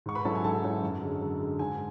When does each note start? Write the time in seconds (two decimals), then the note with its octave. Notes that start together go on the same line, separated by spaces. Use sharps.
0.06 G#2 C#6
0.15 B4 B5
0.25 F#3 C#4 E4 A4 A5
0.35 G#5
0.44 G#2 A4 A5
0.64 F#3 C#4 E4
0.83 F#2
1.02 D3 G#3
1.21 F#2
1.40 D3 G#3
1.59 G#2 G#5